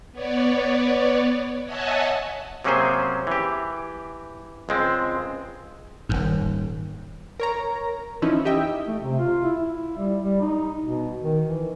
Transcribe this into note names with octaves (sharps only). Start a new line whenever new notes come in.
B3 C#5 D5
C#5 D#5 E5 F#5 G#5 A5
C3 F#3 A#3 C#4 G#4 C5
E3 G4
C#2 G#3 C4
D#1 G#1 G#2
A#4 C#5 A#5
E3 F3 C#4 D#4 E4
G4 D#5 E5 G5
A3
C3
F4
E4
E4
G3
G3
D#4
B2
D#3
E3